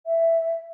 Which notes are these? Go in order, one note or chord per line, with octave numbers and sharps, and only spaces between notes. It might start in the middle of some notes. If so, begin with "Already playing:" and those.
E5